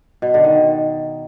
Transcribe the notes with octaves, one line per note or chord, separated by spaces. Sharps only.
B2
D3
D#3